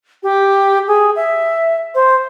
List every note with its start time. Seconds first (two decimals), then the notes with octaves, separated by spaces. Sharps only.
0.23 G4
0.88 G#4
1.16 E5
1.95 C5